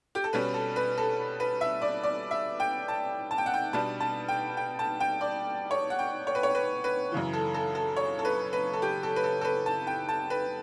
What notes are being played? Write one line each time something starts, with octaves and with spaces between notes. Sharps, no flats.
G4
A4
B2 G3 C#4 B4
A4
B4
A4
B4
E5
D5
D5
E5
G5
A5
A5
G5
F#5
G5
B2 G3 D4 A5
A5
G5
G5
A5
G5
D5
C#5
F#5
G5
C#5
B4
C#5
B4
B4
F#2 C#3 E3
A4
A4
A4
C#5
A4
B4
B4
A4
G4
A4
B4
A4
A4
B4
A5
G5
A5
B4